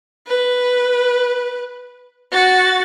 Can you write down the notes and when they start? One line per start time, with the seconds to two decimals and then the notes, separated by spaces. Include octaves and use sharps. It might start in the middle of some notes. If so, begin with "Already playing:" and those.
0.27 B4
2.32 F#4 A6